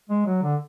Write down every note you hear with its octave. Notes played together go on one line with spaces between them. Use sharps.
G#3
F#3
D3